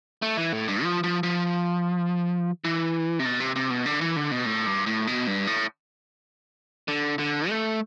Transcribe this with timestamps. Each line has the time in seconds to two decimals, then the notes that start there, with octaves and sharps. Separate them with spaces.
0.22 A3
0.37 E3
0.53 A2
0.68 G2
0.83 F3
1.04 F3
1.23 F3
2.65 E3
3.19 C3
3.25 B2
3.40 C3
3.56 C3
3.70 B2
3.86 D3
4.01 E3
4.16 D3
4.31 B2
4.46 A2
4.66 G2
4.86 A2
5.07 B2
5.27 G2
5.47 A2
6.88 D3
7.19 D3
7.49 A3